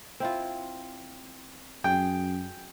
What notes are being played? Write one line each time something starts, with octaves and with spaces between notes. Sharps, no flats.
C4 E4 F4
F#2 G#4 G5